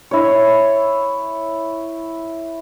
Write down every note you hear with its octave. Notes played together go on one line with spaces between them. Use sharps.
E4 C#5